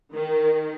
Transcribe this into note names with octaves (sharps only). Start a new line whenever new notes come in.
D#3